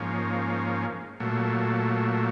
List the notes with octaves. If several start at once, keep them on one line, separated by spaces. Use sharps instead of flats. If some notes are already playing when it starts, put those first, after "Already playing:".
Already playing: G#2 F3 A#3 C#4
A#2 F#3 A3